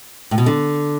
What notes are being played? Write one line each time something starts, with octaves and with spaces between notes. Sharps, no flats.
A2
B2
D3